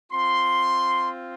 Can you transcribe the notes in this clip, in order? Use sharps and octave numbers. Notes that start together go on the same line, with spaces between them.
C4 F4 C6